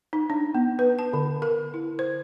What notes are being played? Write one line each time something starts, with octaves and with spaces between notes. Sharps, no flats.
D#4
D4
B3
B4
A5
D3
A#4
E4
C5